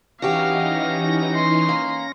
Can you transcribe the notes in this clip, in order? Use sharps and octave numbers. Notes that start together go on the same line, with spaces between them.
E3 C#4 D#4 F#4 G4 F5 A#6
C6
A#3